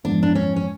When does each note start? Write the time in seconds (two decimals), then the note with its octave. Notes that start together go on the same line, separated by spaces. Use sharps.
0.04 G#2 F3 G#3 B3 D4 E4
0.23 D4
0.35 C#4
0.56 C#4